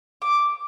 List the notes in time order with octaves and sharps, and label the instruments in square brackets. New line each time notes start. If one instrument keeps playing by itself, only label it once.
[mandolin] D6